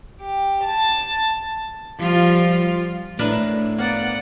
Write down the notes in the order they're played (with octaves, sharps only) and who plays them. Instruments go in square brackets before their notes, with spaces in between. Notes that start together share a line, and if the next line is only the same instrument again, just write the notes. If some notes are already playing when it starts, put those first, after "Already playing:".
[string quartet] G4
A5
[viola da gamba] F3 G3 F4
[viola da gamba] A2 [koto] D4 A#4 B4
[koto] A#3 [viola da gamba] B3 [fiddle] D5 F#5